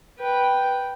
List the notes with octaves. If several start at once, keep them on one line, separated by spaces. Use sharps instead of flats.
B4 G5